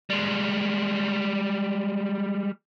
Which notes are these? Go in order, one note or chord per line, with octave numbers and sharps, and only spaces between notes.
G3 G#3